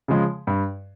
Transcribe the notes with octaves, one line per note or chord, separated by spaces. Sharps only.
C#3 F3 G#3
G2